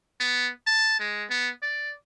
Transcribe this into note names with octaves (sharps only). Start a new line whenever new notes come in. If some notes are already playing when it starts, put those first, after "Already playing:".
B3
A5
G#3
B3
D5